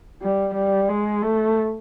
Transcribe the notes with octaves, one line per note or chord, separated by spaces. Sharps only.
G3
G3
G#3
A3